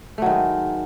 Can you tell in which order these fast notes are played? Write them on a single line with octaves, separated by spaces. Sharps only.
A3 F#3 D#3 G#3